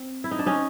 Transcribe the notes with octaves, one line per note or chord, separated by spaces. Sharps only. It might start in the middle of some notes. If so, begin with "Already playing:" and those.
Already playing: C4
E4
D#4
D4
C#4 D#4